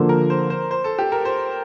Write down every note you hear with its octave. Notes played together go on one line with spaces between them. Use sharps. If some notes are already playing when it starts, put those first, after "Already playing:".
Already playing: D3 F3 A#3 F4 A4 C5
A#4
C5
C5
C5
A4
G4
A#4
C5